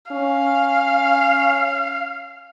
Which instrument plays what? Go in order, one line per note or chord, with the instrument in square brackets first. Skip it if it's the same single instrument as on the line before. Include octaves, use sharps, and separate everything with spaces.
[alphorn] C#4 [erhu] F5